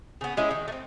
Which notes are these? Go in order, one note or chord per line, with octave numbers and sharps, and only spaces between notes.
C#3 B3
G#3 C#4 E4 G#4
D#3
A3 C4